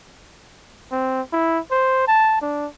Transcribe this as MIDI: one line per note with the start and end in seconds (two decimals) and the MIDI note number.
0.92 1.21 60
1.33 1.59 64
1.72 2.05 72
2.08 2.40 81
2.42 2.67 62